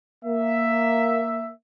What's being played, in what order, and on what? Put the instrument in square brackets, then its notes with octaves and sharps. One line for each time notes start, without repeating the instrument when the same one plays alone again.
[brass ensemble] A#3 E5